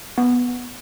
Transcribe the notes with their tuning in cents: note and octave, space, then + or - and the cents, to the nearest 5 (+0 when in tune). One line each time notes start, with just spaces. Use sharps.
B3 -5